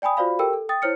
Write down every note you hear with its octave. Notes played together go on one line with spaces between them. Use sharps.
D5 G5 G#5 B5 D#6
F4 F#4 C5 D5 F5 B5
G4 A4 A#4 G5 E6
A4
G5 D#6 A6
E4 C5 C#5 F6 C#7